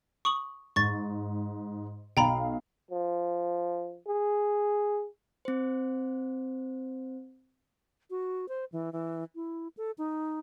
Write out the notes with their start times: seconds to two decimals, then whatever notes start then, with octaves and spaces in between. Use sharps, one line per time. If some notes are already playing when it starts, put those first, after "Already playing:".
0.25 C#6 D#6 F#7
0.76 G#2 C#6 A6
2.17 B1 F5 G5 A#5 B5
2.91 F3
4.07 G#4
5.45 C4 C5
8.10 F#4
8.49 C5
8.72 E3
8.93 E3
9.35 E4
9.77 A4
9.98 D#4